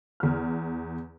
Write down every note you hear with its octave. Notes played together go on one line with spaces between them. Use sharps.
E2 F6